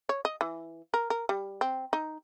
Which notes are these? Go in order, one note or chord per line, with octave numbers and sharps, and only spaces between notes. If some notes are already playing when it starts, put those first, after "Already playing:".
C#5
D#5
E3
A#4
A#4
G3
C4
D#4